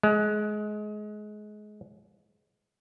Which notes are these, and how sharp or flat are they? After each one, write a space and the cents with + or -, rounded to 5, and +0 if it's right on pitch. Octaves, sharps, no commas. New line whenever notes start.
G#3 +25